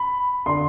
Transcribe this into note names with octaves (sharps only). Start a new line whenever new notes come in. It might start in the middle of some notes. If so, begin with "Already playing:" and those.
Already playing: B5
D3 C6